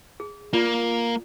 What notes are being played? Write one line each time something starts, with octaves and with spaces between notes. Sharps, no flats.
G#4
A#3 F4 D5